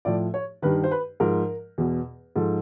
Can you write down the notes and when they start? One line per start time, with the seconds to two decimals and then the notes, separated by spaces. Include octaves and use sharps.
0.05 A2 F3 D5
0.34 C#5
0.62 G2 D#3 B4
0.84 C5
0.91 B4
1.20 G#2 F3 A#4
1.78 E2 B2
2.36 G#2 F3 A4